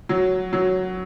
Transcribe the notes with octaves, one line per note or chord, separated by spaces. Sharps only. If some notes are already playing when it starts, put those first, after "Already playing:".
F#3
F#3